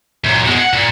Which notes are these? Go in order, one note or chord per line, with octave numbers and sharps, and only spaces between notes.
F#2 A#2
B2 G#3
F#5
A#2